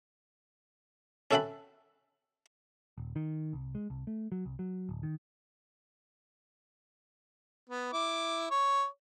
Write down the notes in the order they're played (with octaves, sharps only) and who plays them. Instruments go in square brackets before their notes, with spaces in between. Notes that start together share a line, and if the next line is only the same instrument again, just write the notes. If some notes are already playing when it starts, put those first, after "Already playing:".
[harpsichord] C#4 A4 E5 F#5 G5 B5
[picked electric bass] D#1
D#3
C2
G#3
C2
A3
F#3
C2
F#3
D1
D#3
[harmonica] B3
E4 D6
C#5